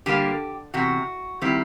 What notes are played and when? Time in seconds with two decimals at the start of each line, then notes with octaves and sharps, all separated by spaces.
0.06 D3 G3 A#3 G4
0.74 E2 C3 F#4
1.41 D#3 G3 C4 E4